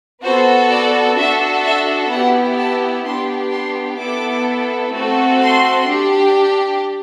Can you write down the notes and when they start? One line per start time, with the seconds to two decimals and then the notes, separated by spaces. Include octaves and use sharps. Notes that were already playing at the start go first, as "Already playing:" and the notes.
0.23 B3 F#4 A4 C5
0.70 D5
1.17 D4 F#4 A4 E5
1.65 E5
2.11 B3 E4 G4 F#5
2.58 A5
3.05 B3 D4 G4 C6
3.52 C6
3.99 B3 E4 A4 D6
4.92 A3 C4 F#4 A4
5.40 C6
5.87 D4 G4